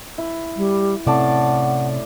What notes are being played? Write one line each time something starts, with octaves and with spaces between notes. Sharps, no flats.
E4
G3
A2 C3 C4 C#4 D5 F#5 A5